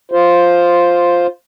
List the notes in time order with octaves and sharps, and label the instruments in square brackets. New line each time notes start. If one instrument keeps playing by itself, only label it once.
[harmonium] F4 C5